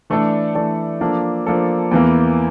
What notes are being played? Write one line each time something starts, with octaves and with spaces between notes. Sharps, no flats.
E3 A3 D4 A4 D5
E3 A3 D4 A4 D5
F3 A#3 D4 A4
F3 A#3 D4 A4
E2 E3 A#3